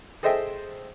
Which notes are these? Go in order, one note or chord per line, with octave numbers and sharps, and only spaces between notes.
G#4 A4 C5 D#5 E5 G5